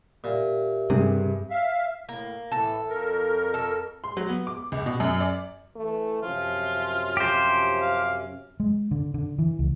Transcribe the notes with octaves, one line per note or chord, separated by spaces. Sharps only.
A#2 G4 E5
G2 C3 G#4
E5 F5
A2 A#3
A2 E3 A4
F2 A#4
A4
C6
F#3
B3
D6
C#2
B2
F#2
D5
E3 A3
F#2 C3 F3 C#4 F4
F3 G4 C5
F5
G#3
D3
D3
E3
C#2